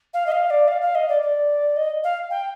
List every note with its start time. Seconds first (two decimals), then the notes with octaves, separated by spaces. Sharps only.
0.13 F5
0.26 D#5
0.31 F5
0.50 D5
0.68 F5
0.81 F5
0.95 D#5
1.08 D5
1.22 D5
1.76 D#5
2.03 F5
2.30 G5